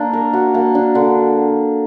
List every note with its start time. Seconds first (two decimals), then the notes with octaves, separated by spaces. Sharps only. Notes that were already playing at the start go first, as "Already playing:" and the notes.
Already playing: A#3 D4
0.13 A#4
0.33 F#4
0.54 A#3
0.75 D4
0.95 D3